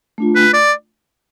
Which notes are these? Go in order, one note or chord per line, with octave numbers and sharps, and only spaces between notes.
A3 D4 F4
B4
D5